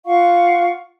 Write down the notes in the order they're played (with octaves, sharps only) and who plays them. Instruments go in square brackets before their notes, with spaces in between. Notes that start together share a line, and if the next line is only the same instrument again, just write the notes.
[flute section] F4 F5 F#5 C#6